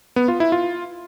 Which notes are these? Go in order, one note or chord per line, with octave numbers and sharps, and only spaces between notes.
B3
F4
E4
F4